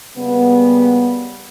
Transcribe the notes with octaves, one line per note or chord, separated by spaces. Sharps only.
C#3 G3 A#3 B3